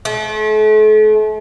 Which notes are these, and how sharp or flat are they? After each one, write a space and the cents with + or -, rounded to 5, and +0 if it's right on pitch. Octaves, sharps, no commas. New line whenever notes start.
A3 -40